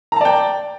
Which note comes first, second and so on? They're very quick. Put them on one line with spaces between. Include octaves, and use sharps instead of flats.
A#5 A5 D5 G5